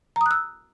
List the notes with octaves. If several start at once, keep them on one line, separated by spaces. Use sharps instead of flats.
A#5 D#6 E6 F#6